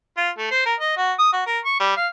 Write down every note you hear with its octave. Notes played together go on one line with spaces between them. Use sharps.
F4
A3
C5
A#4
D#5
F#4
D#6
F#4
A#4
C#6
G3
F5